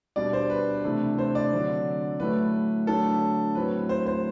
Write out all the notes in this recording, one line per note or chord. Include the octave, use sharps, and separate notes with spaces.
B2 G3 D4 D5
C5
B4
C3 E3 A3 D4
C5
D5
D3 F#3 C4
A2 F#3 A3 B4
D3 F#3 A3 D4 A4
A2 F#3 C4 B4
C5
C5